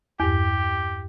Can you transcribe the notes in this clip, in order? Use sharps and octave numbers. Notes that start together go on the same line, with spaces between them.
E2 G2 G4